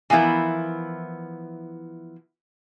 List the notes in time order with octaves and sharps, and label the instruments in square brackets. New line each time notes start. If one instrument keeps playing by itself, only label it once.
[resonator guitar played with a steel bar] E3 F3 B3 E4 A#4